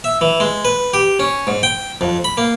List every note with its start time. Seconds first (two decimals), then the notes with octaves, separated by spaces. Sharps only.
0.04 E5
0.21 E3
0.40 G#3
0.65 B4
0.94 G4
1.20 C#4
1.47 G#2
1.63 G5
2.01 F2
2.24 B5
2.37 A#3